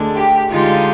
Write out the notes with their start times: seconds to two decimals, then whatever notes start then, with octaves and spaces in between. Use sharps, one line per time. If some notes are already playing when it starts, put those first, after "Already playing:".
Already playing: D2 D3 G#3 D4
0.15 G4
0.51 D3 G#3 D#4 F4 G4